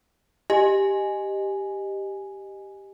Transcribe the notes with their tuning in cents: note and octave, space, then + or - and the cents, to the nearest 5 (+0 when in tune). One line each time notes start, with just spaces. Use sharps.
G4 +0 D#5 -15 G#5 +0